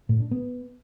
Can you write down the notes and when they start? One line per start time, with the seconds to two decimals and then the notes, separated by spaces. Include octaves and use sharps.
0.09 A2
0.20 D4
0.31 B3